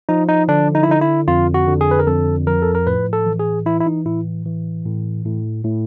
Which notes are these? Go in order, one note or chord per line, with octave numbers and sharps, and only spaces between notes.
F3 D#4
D#4
D3 D4
D#4
E4
D3 D#4
E4
F2 F4
F#4
D3
G#4
B4
A#4
F2 A4
F3 A#4
A4
A#4
A2 B4
A4
E3
G#4
E3 E4
E4
D#4
A2 E4
E3
A2
A2
A2